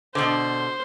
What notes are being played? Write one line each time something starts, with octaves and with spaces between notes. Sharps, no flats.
B2 D3 C5